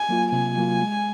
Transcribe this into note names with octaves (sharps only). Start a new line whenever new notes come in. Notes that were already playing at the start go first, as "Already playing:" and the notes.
Already playing: G#5
F#3 A#3 F4
C3 G#5
F#3 A#3 F4
G#3